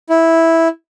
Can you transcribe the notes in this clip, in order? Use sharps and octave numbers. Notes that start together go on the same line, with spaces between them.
E4